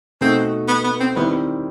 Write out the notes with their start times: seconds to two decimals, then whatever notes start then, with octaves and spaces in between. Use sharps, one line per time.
0.21 B2 A3 C4 D#4 F#4
0.68 B3
0.84 B3
1.00 C4
1.16 D#3 G3 B3 C4 E4